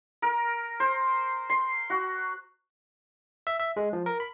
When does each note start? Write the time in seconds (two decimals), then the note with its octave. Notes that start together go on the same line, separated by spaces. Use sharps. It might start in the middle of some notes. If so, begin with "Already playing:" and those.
0.22 A#4
0.80 C5
1.50 C6
1.90 F#4
3.47 E5
3.59 E5
3.76 G#3
3.93 F3
4.06 A#4
4.20 B5